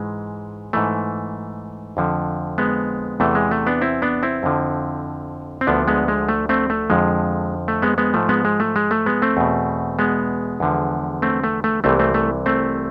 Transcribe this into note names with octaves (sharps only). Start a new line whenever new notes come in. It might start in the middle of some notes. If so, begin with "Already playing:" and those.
Already playing: G#2 E3 G#3
G#2 E3 A3
F2 D3 F3
G#3 B3
E2 C3 E3 A3
G#3
A3
B3 D4
C4 E4
B3 D4
C4 E4
F2 D3 F3
C4
D2 D3 F3 B3 D4
G#3 B3
G#3
A3
A3 C4
A3
F2 D3 F3 G#3
A3
G#3 B3
G#3 B3
G#2 F3 A3
G#3 B3
G#3
A3
G#3
A3
G#3 B3
A3 C4
E2 B2
G#3 B3
E2 D3 F3
A3 C4
A3
A3
C2 C3 E3 A3 C4
A3 C4
A3
A3 C4